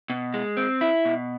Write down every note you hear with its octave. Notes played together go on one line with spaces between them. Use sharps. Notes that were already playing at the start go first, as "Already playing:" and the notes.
B2
G#3
C4
E4
B2